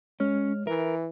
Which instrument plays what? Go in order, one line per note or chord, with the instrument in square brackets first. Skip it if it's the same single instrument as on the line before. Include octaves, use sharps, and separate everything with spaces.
[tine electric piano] G#3 C#5 F6 [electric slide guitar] C#4
[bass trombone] E3 [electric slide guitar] A#4 [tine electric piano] E5